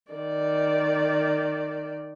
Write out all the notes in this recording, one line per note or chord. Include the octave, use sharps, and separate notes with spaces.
D#3 D5